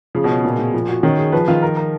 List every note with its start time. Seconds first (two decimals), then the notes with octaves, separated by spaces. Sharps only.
0.15 C#3 F3
0.24 B2
0.30 C#4
0.45 A#2
0.59 A#2
0.74 F3
0.89 F#4
1.03 D#3 C#4
1.18 G#4
1.32 F3 B4
1.48 D#3 F4
1.62 A#4
1.77 A#4